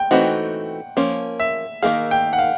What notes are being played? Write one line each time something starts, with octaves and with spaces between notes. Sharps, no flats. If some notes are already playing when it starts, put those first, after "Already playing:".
Already playing: G5
E3 A3 C4 D#4 F#4 F#5
F3 A#3 C#4
E5
D#3 F#3 A#3 D#4 G#4 F5
G5
F#5
F5